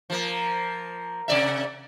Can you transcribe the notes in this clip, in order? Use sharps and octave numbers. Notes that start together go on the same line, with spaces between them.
F3 A#3
C3 D5 E5